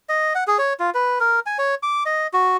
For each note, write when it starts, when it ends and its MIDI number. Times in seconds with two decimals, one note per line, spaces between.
0.09 0.33 75
0.35 0.44 78
0.47 0.58 68
0.59 0.73 73
0.80 0.90 65
0.94 1.19 71
1.20 1.40 70
1.46 1.58 80
1.59 1.75 73
1.83 2.03 86
2.06 2.27 75
2.33 2.57 66